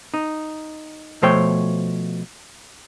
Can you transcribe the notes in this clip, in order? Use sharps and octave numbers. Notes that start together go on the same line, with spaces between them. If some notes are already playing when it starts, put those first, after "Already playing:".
D#4
B2 F3 A3 C5 C#5 G5